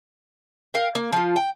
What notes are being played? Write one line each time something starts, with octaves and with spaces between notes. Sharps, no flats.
A#4 F5 G5
A#3
F3 F4
G5